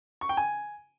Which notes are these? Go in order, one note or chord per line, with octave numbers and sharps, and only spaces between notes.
C#6
G5
G#5